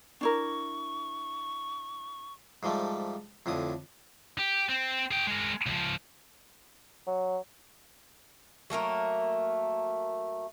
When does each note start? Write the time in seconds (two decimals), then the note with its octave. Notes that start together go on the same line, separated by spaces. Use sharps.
0.21 D4 E4 A#4 C#6
2.63 G#2 F3 G3 A3
3.46 F2 A2 D3 D#6
4.39 G4
4.69 C4
5.11 G#4 G5
5.27 G#3 A#4
5.66 C#2 F3
7.07 F#3
8.70 F#3 A3 A#3 A#4